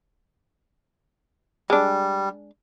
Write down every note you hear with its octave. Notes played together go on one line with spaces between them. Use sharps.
G3 G#3 D4